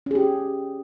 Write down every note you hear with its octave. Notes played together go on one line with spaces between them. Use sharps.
C#4 G4 G#4